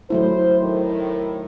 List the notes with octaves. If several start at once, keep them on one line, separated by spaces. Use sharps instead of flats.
F#3 A3 E4 C5
A2 D#3